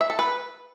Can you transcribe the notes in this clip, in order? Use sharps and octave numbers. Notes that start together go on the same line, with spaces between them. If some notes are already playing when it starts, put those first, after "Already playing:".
E5
A4
B4